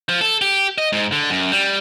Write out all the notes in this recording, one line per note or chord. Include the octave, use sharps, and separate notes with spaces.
F3
A4
G4
D#5
G#2
D3
F#2
G3